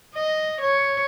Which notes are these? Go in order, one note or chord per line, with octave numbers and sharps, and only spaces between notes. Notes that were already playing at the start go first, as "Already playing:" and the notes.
D#5
C#5